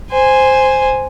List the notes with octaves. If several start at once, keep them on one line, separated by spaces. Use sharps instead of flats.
C5 G#5